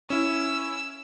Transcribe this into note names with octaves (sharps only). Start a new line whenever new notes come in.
C#4 E4 E6